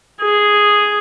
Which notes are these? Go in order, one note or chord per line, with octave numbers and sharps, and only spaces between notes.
G#4 D#6